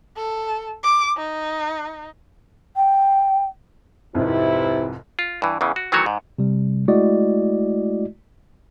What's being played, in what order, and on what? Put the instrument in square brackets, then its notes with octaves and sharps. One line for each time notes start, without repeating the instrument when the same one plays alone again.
[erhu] A4
D6
D#4
[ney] G5
[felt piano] C2 F2 G#2 [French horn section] C3 E4 B4
[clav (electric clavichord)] F4
G2 E3
E2 C#3 E3
F#4
D#3 E3 F#3 A3 F#4 C#5
G#2
[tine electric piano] C3 G3
G#3 A3 E4 F#4 D5 D#5